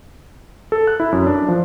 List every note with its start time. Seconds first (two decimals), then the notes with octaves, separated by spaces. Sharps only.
0.72 A4
0.87 F#6
1.00 E4
1.12 F#2
1.27 D4
1.48 F3